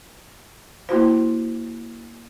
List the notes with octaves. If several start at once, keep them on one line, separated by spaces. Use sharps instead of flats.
A#3 E4 F#4 C5